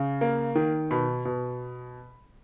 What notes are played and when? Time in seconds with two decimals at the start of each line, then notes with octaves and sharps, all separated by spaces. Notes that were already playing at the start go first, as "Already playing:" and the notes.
Already playing: C#3
0.21 A#3
0.55 D#3
0.91 B2 B5
1.25 B2